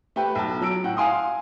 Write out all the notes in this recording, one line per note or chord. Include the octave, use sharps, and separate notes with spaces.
A3 G4 B4
B1 A5
F#3 E6 D7
A2 F#5 G5
F5 G#5 C6 D#6